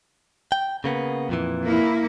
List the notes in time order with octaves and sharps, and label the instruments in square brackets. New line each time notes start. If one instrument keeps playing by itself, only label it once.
[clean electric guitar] G5
C#3 A#3 B3
F2 A#2 E3
[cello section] A#3 E4